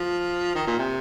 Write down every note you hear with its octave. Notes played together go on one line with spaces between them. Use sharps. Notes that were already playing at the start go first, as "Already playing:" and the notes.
Already playing: F3
D#3
A#2
C3